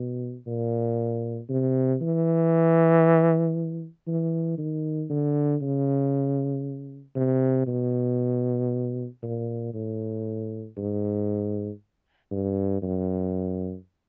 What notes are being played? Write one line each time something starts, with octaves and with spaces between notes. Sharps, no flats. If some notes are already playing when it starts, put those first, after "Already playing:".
Already playing: B2
A#2
C3
E3
E3
D#3
D3
C#3
C3
B2
A#2
A2
G#2
G2
F#2